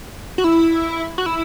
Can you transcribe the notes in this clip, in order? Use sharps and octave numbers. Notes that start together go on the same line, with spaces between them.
F#4
E4
F#4
E4